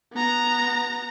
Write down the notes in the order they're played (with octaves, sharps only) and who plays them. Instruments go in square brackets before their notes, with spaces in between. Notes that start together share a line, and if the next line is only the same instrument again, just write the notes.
[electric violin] B3 A#5